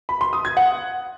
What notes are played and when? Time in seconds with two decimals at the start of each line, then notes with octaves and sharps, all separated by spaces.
0.09 B5
0.21 C6
0.33 D#6
0.45 G#6
0.57 F#5